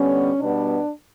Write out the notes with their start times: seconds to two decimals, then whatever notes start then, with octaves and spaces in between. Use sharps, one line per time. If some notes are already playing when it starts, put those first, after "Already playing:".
Already playing: D3 G3 B3 C#4
0.40 B2 G3 B3 D4